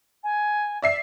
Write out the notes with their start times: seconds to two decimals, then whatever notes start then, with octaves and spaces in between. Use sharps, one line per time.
0.24 G#5
0.82 D5 E5 C7